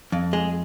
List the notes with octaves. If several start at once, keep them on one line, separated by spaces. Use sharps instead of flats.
F2
G#3